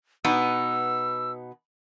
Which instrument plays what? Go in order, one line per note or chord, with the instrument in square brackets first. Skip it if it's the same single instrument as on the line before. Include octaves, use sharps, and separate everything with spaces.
[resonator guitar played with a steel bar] B2 B3 D#4 [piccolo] E6